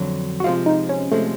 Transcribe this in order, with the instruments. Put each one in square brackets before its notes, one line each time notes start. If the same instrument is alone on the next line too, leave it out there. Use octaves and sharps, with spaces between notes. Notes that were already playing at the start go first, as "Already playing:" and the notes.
Already playing: [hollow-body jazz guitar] F2 D3 F#3
[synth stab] F#4
[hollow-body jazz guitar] C3 F3 G#3 [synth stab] F4
[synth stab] D#4
C#4
[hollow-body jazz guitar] C3 F3 G#3 [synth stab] A3